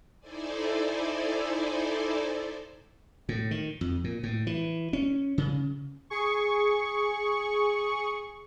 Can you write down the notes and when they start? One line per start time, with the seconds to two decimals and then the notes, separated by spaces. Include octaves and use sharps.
0.20 D#4 E4 A4 C5 D5 G#5
3.29 A2
3.51 D#3
3.81 F2
4.04 A#2
4.23 A2
4.47 E3
4.93 C#4
5.38 C#3
6.10 G#4 C#6